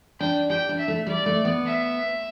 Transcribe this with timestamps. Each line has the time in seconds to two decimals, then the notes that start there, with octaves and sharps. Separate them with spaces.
0.20 D4 G5
0.50 G4 G5
0.69 D4
0.79 E5
0.88 A3
1.07 G3 D5
1.26 A3
1.45 B3
1.65 E5